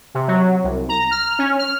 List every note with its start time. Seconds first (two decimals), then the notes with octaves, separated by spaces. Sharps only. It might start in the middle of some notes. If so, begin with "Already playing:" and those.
0.14 C3
0.28 F#3
0.64 C2
0.89 A#5
1.11 F6
1.39 C#4
1.59 F6